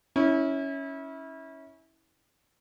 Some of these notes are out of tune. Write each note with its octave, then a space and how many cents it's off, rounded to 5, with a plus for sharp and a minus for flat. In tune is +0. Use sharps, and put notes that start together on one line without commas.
C#4 +0 E4 -25